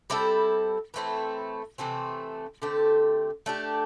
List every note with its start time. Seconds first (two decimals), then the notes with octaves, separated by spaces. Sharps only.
0.10 G3 C4 E4 A4
0.94 E3 A3 C4 E4
1.78 C3 E3 A3 C4
2.62 D3 A3 C4 G4
3.46 A3 D4 G4